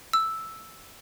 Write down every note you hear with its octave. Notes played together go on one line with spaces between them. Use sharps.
E6